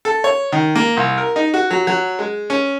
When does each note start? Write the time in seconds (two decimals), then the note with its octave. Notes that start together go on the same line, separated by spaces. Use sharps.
0.05 A4
0.24 C#5
0.52 D#3
0.76 A#3
0.97 C2
1.18 A#4
1.36 D#4
1.54 F#4
1.71 F#3
1.87 F#3
2.19 G#3
2.50 C#4